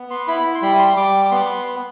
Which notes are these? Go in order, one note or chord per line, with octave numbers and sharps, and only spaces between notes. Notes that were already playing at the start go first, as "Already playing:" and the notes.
Already playing: B3
C6
E4 B5
C6
G3 B5
C6
G3 D6
D6
B3 C6